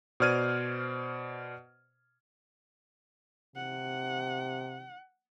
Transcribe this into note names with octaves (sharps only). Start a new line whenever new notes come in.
B2 C5 D5 F6 G#6 D#7
C3 F#5